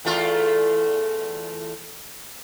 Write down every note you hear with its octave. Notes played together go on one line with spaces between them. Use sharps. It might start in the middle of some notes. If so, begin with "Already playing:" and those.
E2 A3 F4